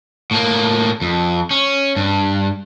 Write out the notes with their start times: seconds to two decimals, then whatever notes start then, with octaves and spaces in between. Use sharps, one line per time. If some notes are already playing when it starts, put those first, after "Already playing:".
0.31 A2 A#3
1.02 F2
1.51 C#4
1.96 G2